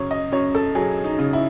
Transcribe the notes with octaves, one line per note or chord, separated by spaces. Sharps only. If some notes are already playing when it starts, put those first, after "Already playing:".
Already playing: F#2 C#3 C#5
D#5
F#2 C#5
A4
F#3 G#4
D#4
C#3
E4